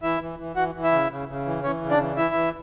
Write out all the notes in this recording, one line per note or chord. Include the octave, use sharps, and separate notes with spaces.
E3 E4 E5
E3
E3
E3 F#4 F#5
E3
E4 E5
C#3
C#3
C#3
E3
E3 C#4 C#5
C#3
D4 D5
E3
E3 E4 E5
E3